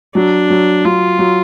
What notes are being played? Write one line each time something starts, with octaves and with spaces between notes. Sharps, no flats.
F#3 D4
F#3
F#3 F4
F#3